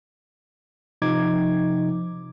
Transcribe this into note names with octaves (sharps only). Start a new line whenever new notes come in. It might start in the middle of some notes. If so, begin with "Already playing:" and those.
C3 F3 D#4 D6 G#6